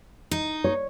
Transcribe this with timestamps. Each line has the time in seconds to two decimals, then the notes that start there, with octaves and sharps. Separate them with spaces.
0.31 D#4
0.64 C#5